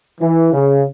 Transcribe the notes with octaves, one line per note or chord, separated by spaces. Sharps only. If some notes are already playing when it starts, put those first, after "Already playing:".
E3
C#3